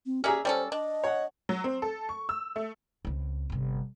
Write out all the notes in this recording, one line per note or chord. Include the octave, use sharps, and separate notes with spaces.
C4
C#4 G4 G#4 D5 E5 A#5 F6
G3 C#4 A4 C5 D5
D4 D#5
C#5 F#5
F#3
C4
A4
C#6
E6
A3
C#2 C4
G1 C3